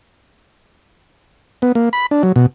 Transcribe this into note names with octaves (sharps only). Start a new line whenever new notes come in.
B3
A#3
B5
D4
F#3
B2